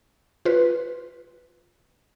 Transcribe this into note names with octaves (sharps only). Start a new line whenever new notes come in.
F4 B4